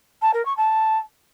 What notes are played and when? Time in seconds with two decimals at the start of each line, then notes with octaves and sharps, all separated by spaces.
0.22 A5
0.34 A#4
0.45 C#6
0.57 A5